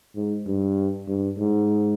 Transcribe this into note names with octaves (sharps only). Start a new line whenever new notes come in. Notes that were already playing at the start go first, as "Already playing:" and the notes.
G#2
G2
G2
G#2